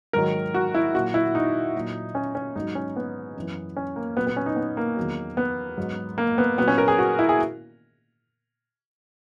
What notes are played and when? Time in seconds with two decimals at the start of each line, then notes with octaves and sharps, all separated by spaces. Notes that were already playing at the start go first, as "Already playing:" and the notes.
0.13 G#2 D#3 F#3 A#4
0.54 F#4
0.74 E4
0.94 A#2 F#3 F#4
1.14 E4
1.35 D#4
1.75 A#2 F#3
2.15 C#4
2.35 C#4
2.55 G#2 F#3 D#4
2.75 C#4
2.96 B3
3.36 F#2 E3
3.76 C#4
3.96 A#3
4.16 A#2 F#3 B3
4.27 B3
4.36 C#4
4.46 D#4
4.56 B3
4.77 A#3
4.96 E2 D#3 F#3
5.37 B3
5.77 G#2 F#3
6.18 A#3
6.38 B3
6.57 A#2 F#3 B3
6.68 C#4
6.78 A#4
6.88 G#4
6.99 F#4
7.19 E4
7.29 G#4